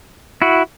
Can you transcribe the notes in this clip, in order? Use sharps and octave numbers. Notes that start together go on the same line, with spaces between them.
E4 F#4